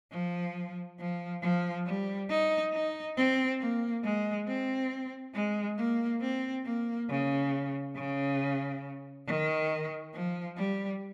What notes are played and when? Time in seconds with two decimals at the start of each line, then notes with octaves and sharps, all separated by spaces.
0.11 F3
0.99 F3
1.41 F3
1.86 G3
2.29 D#4
2.72 D#4
3.17 C4
3.60 A#3
4.03 G#3
4.48 C4
5.34 G#3
5.77 A#3
6.21 C4
6.65 A#3
7.09 C#3
7.95 C#3
9.27 D#3
10.14 F3
10.57 G3